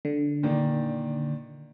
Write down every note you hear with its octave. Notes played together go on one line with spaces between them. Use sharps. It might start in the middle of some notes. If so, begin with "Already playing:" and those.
D3
A#2 D#3 D4